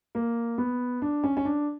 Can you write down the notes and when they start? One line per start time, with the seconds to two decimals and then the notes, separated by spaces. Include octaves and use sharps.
0.15 A#3
0.58 B3
1.02 D4
1.24 C#4
1.37 C#4
1.45 D4